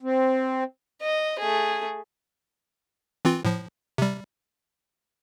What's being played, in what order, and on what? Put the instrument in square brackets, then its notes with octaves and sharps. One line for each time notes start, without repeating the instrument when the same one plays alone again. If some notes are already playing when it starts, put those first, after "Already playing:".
[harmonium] C4
[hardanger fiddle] D#5
A3 G#4
[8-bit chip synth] E3 C4 F4
A2 F3
C3 G3